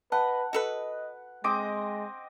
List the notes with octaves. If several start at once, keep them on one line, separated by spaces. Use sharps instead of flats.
B4 D#5 F#5 A5
F#4 A4 B4 D#5
G#3 C4 D#5 D6